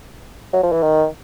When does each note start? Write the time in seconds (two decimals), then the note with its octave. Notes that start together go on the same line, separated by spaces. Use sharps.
0.53 F#3
0.63 F3
0.72 E3
0.83 D#3